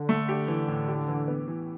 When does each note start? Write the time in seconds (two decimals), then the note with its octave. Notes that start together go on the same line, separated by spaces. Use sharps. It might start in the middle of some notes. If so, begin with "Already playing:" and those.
Already playing: D3
0.09 A3
0.29 G4
0.48 E3
0.68 A2
0.88 G4
1.08 E3
1.28 B3
1.48 E3